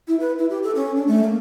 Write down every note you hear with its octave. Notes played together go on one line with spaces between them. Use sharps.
E4
B4
E4
G4
A4
C#4
D4
A3
A#3